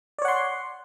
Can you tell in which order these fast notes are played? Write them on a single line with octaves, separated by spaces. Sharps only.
D5 C#5 F#5 C6